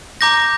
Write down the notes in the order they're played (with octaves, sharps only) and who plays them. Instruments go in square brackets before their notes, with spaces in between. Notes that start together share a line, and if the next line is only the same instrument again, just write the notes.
[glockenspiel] A#5 D6 G6 A#6